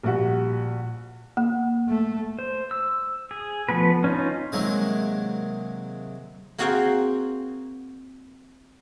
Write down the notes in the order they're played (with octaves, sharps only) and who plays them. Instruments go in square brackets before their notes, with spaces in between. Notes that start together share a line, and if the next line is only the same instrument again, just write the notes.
[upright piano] A#1 G3 F#4
[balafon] A#3
[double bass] A3
[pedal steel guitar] C5
E6
G#4
F3 A3 B3 B4
C#4 D#4 F4
[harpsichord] C3 D#3 F#3 G#3 A#3
[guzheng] A#3 C4 F#4 G#4 F5 G5